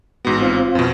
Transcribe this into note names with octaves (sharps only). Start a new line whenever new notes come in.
A1 G#2 B3 F#4 A#6
C4 F4
F2 B2